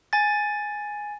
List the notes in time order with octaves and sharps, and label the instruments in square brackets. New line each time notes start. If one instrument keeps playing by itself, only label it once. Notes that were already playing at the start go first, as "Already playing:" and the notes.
[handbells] G#5 A6